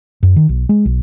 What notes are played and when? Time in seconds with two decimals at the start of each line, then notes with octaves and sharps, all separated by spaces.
0.23 F#2
0.36 D#3
0.49 B1
0.69 G#3
0.85 B1